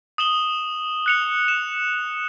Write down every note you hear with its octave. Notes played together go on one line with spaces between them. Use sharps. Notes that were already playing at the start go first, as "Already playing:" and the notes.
D#6 E7 F#7 G7
F#6 C#7 F7
E7